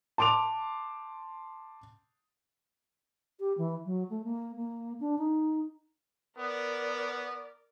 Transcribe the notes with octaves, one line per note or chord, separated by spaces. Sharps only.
A5 C6 D6 D7 F7
G4
E3
F#3
A3
A#3
A#3
D4
D#4
B3 A#4 D5